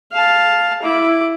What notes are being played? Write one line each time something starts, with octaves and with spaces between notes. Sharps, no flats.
F5 A5
E4 D6